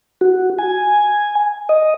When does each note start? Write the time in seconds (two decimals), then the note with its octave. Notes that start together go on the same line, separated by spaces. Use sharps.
0.21 F#4
0.59 G#5
1.69 D#5